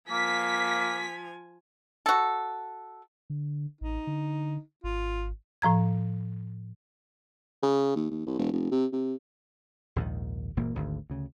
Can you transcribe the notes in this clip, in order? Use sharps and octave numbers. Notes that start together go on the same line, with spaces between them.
F3 A#3 G#5 B6
F#4 A4
D3
A1 D#4
D3
G#1 F4
A2 F3 A#5 G#6
C#3
D#2
D#2
C2
E1
F1
C3
C3
A#1 D#2 G#2 D#3
F#1 A#2 E3 A#3
G#1 D2 D3
D2 C#3